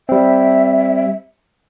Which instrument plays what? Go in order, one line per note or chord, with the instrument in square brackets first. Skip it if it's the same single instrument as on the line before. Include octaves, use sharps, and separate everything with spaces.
[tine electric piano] G3 C4 [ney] E5